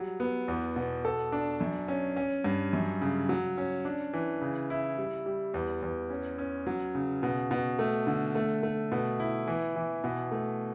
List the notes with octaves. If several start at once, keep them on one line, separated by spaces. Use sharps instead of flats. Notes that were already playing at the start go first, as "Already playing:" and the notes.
Already playing: F#3 G3
B3
E2
B2
A4
D4
F#2
C#4
C#4
G2
F#2
C#3
F#3
C#4
D4
E3
C#3
E4
G3
G3
E2
E2
C#4
C#4
F#3
C#3
B2
B2
A3
D3
A3
A3
B2
E4
E3
E3
B2
A3